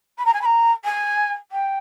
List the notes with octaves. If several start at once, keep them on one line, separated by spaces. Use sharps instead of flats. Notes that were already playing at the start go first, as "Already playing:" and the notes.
B5
A#5
G#5
B5
A#5
G#5
G5